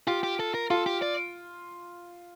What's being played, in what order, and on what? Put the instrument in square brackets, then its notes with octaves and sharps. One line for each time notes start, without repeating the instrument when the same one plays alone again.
[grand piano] F4 [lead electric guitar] G4
[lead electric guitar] G4
A4
A#4
[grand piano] F4 [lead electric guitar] A4
[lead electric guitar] G4
D5